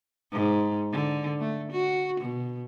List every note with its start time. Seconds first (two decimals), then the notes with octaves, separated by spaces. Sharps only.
0.32 G#2
0.92 D3
1.40 A3
1.72 F#4
2.20 B2